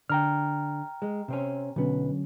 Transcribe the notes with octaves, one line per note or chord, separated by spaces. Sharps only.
D3 G5 A#5 F6
G#3
C3 C4 C#4
B1 D3 F#3 B3 C#4